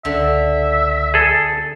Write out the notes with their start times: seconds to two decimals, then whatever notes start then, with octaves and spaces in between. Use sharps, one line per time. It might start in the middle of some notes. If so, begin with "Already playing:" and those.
0.05 C#2 D3 E5
1.14 G#4 A4